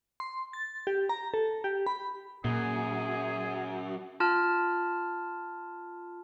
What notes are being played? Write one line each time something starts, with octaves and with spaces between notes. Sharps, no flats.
C6
A6
G4
A#5
A4
G4
B5
F#2 A#2 G#4
F4 A5 F6